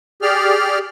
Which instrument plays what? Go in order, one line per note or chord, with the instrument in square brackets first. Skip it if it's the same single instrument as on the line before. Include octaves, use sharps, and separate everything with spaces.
[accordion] G4 G#4 D5 F6